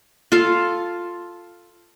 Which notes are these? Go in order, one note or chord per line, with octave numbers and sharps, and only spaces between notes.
F4 A4 F5